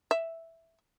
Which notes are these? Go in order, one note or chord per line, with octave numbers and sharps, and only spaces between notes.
E5